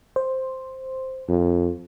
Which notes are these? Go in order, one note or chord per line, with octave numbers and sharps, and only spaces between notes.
C5
F2